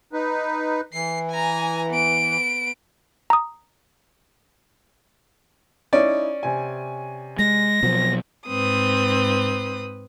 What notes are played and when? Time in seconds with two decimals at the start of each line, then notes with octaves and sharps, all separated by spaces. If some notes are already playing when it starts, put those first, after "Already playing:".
0.13 D#4 B4
0.93 E3 C7
1.30 G#5 A#5
1.90 B3 D7
3.30 A#5 D#6
5.93 C#4 D#4 E4 D5
6.43 C3 G#5
7.39 G#3 A#6
7.83 B2 F3 F#3 C4
8.47 G#2 C4 B4 D#6